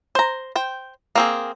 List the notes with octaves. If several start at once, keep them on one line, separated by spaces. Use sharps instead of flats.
C5 A#5
C5 G5
A#3 C4 G#4